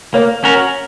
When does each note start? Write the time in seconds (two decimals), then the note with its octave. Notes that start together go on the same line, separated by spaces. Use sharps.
0.14 A#3 C#5
0.44 C#4 F#4 A#4